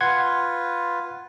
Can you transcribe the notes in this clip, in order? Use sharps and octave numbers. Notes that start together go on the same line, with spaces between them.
F4 B4 F#5 C6 G#6